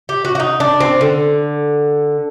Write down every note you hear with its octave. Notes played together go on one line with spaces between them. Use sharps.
G4
F#4
F#4
D#4
D4
C4
D3